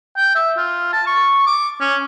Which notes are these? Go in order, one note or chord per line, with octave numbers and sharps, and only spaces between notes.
G5
E5
F4
A5
C#6
D6
C#4